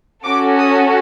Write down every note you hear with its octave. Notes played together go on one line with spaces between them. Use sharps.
C#4 F#4 A4 D6
D#6